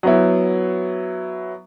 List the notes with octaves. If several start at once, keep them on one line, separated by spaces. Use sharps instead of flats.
F#3 B3 E4